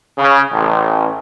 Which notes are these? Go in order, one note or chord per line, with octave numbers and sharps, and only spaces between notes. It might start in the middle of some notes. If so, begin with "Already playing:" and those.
C#3
A1